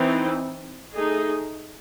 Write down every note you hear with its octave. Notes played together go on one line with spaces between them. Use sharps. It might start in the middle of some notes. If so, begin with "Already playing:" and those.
Already playing: E3 C4 D#4
A3 D#4 G#4